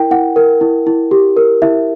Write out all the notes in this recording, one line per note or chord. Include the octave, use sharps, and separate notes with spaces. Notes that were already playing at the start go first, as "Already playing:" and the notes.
Already playing: E4 A#4 G5
E4 F#5
A#4
E4
E4
G4
A#4
E4 E5